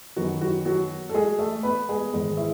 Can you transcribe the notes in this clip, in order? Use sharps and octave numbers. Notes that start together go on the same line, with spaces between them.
F#2 D#3 F#3 B3 F#4
F#3 F#4
F#3 F#4
A4
G#3 G#4
A3 A4
B3 B4
G#3 G#4
G#2 D#3 G#3 B3 G#4
E4